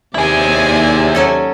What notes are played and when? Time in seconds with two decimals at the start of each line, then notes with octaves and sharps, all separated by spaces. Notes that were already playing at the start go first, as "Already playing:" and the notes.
0.15 D#2 C3 E4 G#4 D5 G#5
1.15 F#3 C#4 A4